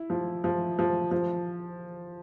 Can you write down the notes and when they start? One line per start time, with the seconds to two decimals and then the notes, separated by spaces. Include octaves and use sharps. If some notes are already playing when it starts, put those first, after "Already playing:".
Already playing: E4
0.10 F3
0.44 F3
0.79 F3
1.11 F3